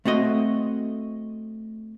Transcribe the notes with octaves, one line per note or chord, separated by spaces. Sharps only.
A3 C4 F#4 D#5